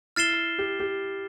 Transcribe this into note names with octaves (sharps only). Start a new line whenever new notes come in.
E4 F6 A6 C7 E7 G7
G4
G4